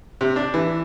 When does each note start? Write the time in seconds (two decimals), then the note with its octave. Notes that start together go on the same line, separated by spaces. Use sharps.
0.21 C3
0.36 D4
0.54 E3